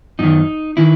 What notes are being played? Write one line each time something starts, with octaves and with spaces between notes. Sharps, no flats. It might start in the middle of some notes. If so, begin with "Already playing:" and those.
F#2 D#3 D#4
D#3 E4